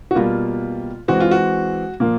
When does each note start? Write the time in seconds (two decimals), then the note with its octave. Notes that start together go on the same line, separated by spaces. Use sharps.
0.11 F#4
0.15 B2 G3 A#3 F4
1.08 E3 G#3 C4 F#4
1.20 F4
1.31 F#4
2.00 A#2 F3 A#3